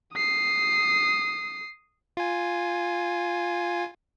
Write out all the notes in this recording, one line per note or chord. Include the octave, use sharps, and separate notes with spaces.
D#6 C7
F4 G#5